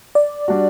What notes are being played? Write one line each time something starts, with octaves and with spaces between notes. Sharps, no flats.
D5
G3 D4 F#4